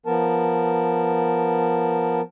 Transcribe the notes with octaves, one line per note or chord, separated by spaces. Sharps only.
F3 B3 A#4 A5